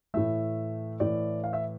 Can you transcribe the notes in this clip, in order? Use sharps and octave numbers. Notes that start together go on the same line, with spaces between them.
A2 E3 A3 E5
A2 E3 A3 D5
F5
E5